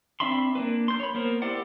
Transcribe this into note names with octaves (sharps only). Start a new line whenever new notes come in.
C4 D4 E5 B5 C6
A#3 D4 B4
C6 G6
C#5 B5
A#3 B3 A#4 C5
E4 G4 C5 D5 F#5